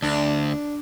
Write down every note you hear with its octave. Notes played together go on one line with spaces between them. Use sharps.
D2 D4